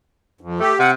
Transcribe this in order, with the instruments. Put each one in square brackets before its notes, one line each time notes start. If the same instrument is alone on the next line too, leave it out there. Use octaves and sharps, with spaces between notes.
[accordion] F2
[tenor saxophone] A3 [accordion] G4
[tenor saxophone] C3 [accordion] F#5